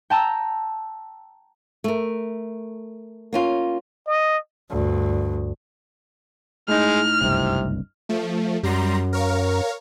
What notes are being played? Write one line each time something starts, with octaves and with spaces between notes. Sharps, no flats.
G5 A5 A#5 E6
A3 A#4
A#3 C#4 F4
D#5
D2 G2
A2 G#3 D#4 F6
F#1 C2 G2 C3
F3 A3
F#2 G3 A#5 C6
A#4 C#5 F5